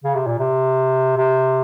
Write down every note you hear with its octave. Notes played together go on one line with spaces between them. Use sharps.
C#3
C3
A#2
C3
C3